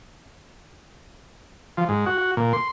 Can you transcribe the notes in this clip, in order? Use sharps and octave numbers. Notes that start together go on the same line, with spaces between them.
F3
G#2
F#4
F#4
A#2
C6